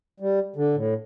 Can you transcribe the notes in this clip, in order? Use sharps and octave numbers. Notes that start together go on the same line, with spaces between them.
G3
D3
A2